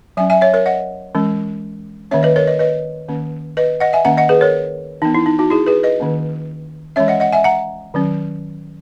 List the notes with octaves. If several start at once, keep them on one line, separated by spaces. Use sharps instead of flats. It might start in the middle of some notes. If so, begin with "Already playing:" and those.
F#3 C#4 E5 G#5
E5 G#5
C#5 E5
A#4 C#5
D#5 F#5
E3 G#3 C#4
D#3 A#3 C#4 C#5 E5
B4 D#5
A#4 C#5
B4 D#5
B4 D#5
D#3 A#3 C#4
B4 D#5
D#5 F#5
E5 G#5
D#3 A#3 C#4 F#5 A#5
D#5 F#5
G#4 B4
A#4 C#5
E3 B3 D#4
E4
D#4
D#4 F#4
E4 G#4
G#4 B4
B4 D#5
D#3 A#3 C#4
E3 G#3 C#4 C#5 E5
D#5 F#5
D#5 F#5
E5 G#5
F#5 A#5
D#3 F#3 C#4